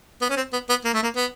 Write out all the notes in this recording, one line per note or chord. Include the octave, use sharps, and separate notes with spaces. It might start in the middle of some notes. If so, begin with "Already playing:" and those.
B3
C#4
C4
B3
B3
A#3
A3
A#3
B3